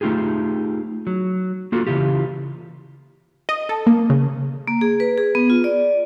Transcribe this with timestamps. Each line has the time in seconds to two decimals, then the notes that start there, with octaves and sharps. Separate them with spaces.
0.01 A3 D#4 F4 G4 G#4
1.07 F#3
1.72 A#3 F4 F#4 A4
1.87 C#3 E3 F4 G4
3.49 D#5
3.69 A4
3.87 A#3
4.10 C#3
4.68 A#3
4.81 G#4
5.00 B4
5.18 G#4
5.35 B3
5.50 F4
5.64 D5